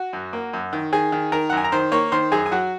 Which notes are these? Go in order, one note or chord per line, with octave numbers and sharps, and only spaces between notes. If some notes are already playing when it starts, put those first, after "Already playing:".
Already playing: F#4 F#5
F#2
A#3
F#2
D#3
D#3 G#4 G#5
D#3
D#3 A#4 A#5
F#5
F#2 G#5
A#5
D#3 C5 C6
A#3 C#5 C#6
D#3 C5 C6
F#2 G#4 G#5
G#5
F#3 F#4 F#5